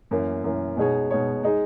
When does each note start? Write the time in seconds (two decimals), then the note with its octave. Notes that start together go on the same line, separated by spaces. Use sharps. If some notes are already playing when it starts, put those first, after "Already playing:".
0.11 F#2 E3 A#3
0.44 F#2 E3 A#3
0.77 B2 G#3 D#4 G#4 C#5
1.11 B2 G#3 D#4 G#4 C#5
1.43 G#3 D#4 G#4